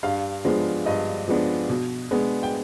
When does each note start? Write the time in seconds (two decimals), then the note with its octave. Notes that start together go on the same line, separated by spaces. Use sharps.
0.03 G2 F5
0.45 F3 G#3 B3 D4
0.86 G2 D#5
1.28 F3 G#3 B3 D4
1.69 B2
2.11 G#3 B3 D4
2.43 G5